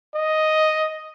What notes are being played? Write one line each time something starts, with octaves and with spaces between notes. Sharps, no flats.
D#5